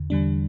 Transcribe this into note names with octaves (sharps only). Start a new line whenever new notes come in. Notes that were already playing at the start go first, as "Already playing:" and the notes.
Already playing: E2 D3
E2 D3 G3 D4